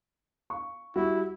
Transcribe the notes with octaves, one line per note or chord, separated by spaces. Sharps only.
F5 C#6
G3 E4 F#4